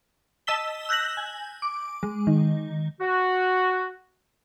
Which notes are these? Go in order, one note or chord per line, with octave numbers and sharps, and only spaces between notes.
D#5 A5 E6 B6 G7
E6 F#6 G6 A#6 F#7
G#5
D6
G#3
D#3
F#4